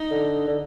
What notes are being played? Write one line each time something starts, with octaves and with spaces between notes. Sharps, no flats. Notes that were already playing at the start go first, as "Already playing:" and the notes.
Already playing: D#4
D3
D3